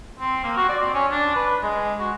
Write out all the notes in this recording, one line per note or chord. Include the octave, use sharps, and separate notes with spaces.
C4
A#3
F#4
D5
C4
C#4
D4
B4
G#3
F#4